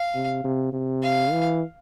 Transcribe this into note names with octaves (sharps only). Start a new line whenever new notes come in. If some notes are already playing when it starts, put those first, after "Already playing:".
Already playing: F5
C3
C3
C3
F5
E3